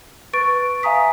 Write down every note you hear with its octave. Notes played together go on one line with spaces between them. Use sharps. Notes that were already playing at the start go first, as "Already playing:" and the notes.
B4 C#6 A6 D7
E5 F5 G#5 A#5 D#6 B6